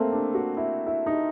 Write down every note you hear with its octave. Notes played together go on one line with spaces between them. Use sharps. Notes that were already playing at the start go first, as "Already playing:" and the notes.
Already playing: A3 A#3 C4
D4
F#4
E4
E4
D#4